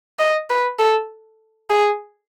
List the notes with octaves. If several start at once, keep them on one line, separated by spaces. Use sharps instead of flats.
D#5
B4
A4
G#4